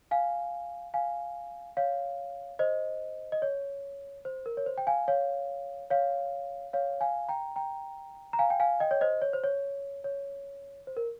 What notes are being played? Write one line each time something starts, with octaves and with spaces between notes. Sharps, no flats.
F5 G#5
F5 G#5
C#5 F5
C5 D#5
D#5
C#5
C5
A#4
C#5
C5
G5
F5 G#5
C#5 F5
C#5 F5
C#5 F5
F5 G#5
G5 A#5
G5 A#5
A#5
F5 G#5
G5
F5 G#5
D#5 G5
C#5
C5 D#5
C#5
C5
C#5
C#5
C5
A#4